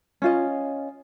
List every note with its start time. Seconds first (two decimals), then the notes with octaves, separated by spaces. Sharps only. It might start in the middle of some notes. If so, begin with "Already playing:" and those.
0.22 C#4 F4 D#5